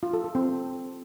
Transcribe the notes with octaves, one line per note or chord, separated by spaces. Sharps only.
F4
A4
A4
C4